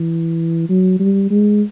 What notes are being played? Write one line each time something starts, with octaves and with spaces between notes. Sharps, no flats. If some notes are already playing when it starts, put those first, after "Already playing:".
Already playing: E3
F#3
G3
G#3